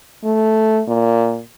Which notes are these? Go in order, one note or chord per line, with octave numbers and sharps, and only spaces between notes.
A3
A#2